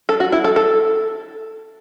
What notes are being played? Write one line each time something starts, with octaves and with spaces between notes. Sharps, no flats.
A4
F#4
E4
A4
A4